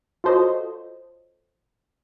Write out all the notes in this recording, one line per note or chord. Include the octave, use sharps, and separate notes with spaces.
F4 F#4 A4 C5 C#5 D#5